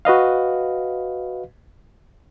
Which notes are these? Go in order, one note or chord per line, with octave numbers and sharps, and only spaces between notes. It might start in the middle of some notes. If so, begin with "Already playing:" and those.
F#4 B4 D#5 F5